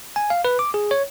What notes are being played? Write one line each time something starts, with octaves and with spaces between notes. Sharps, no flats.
G#5
F5
B4
D6
G#4
C#5